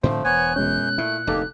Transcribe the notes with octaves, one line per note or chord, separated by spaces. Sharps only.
A2 D3 F3 A3 C4 C5
E1 B3 C#5 G#5 F#6
F#2 B2 G#3 C#4 G6
A#2 A3 E4
F1 D2 A#3 D#4 G4 A4